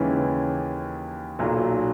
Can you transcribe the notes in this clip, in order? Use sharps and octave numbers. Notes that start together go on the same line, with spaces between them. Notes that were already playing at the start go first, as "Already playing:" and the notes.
Already playing: D#2 C#3 E3 G#3 C#4
B1 A#2 F#3